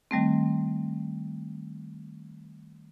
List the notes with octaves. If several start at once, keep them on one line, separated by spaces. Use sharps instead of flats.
D#3 G3 A3 C4